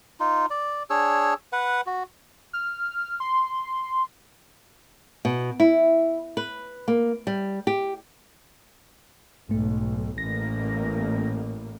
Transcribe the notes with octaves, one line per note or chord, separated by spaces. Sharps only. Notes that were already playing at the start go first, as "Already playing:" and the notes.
D#4 F4
D5
D4 G#4 C#5 E6
B4 F#5
F#4
F6
C6
B2
E4
B4
A#3
G3
G4
B1 G#2 A3
A1 A2 A#3 A#6